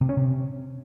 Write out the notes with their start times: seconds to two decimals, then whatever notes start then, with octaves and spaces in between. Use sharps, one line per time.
0.01 C3
0.09 C#4
0.17 C3